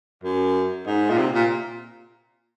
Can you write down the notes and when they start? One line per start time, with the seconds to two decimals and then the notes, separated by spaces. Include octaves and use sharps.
0.24 F#2
0.87 G#2
1.10 A#2
1.18 C3
1.34 A#2